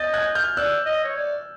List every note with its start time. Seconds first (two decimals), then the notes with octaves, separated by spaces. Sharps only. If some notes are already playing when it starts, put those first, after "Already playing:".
Already playing: D#5 G6 A6
0.14 F#6 G#6
0.35 F6 G6
0.57 D5 E6 F#6
0.86 D#5
1.04 C#5
1.15 D5